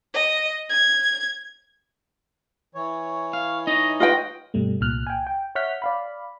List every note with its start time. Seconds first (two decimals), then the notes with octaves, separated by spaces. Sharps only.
0.14 D#5
0.70 G#6
2.75 E3 C#5
3.33 F5
3.67 D#4 D#5
4.00 F4 B4 D#5 G5
4.54 G2 B2 G3 A3
4.81 C2 A#2 F6 F#6
5.07 G5 G#5
5.27 G5
5.55 C#5 E5 F#5 F6 G6 B6
5.82 D5 F5 B5